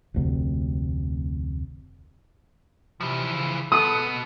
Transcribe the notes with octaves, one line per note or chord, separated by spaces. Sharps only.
F1 D2 C3
C3 E3 F3
C#3
B2 B3 A4 D#6